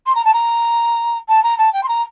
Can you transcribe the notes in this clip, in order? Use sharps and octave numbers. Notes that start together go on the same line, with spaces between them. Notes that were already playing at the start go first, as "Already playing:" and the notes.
C6
A#5
A5
A#5
A5
A#5
A5
G5
C6
A#5